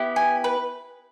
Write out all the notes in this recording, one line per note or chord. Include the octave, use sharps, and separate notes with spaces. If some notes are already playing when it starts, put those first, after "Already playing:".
Already playing: B3 E4 G4
G#5
B4